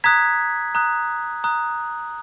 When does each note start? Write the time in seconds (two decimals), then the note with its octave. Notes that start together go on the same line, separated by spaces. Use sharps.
0.04 A#5 D#6 F#6 G#6 B6
0.75 A#5 D#6 F#6
1.44 A#5 D#6 F#6